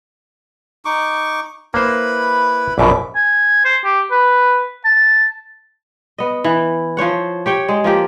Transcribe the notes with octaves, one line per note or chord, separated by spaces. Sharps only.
D#4 C#6 D6
A#3 E4 B4 C5 B5
A#1 F#2 B2 E5 D6
G#5
C5
G4
B4
A5
B3 D#5
E3
F3 C5 C#5 F#5
G4 C#5 G5
G#3
F3 A#3 G4